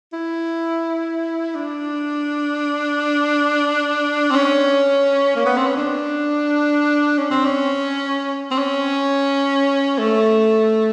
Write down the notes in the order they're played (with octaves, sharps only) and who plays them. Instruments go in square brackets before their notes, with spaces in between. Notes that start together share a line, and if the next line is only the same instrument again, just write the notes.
[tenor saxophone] E4
D4
C4
C#4
A#3
B3
C4
C#4
D4
C#4
C4
C#4
C4
C#4
A3